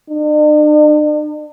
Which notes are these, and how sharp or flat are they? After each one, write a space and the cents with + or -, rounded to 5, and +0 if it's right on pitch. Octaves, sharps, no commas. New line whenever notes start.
D4 +45